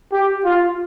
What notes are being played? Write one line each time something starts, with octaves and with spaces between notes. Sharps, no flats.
G4
F4